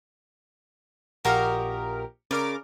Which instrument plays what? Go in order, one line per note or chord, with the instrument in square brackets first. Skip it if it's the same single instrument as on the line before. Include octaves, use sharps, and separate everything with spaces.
[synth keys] A#1 G4 A#4 [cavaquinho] F#4 D#5 F5
[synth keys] C#3 A#4 D6 [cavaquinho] D5